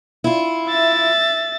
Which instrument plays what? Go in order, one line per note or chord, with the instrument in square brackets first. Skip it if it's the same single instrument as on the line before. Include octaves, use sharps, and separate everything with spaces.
[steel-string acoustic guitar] E4 F4
[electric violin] E5 A6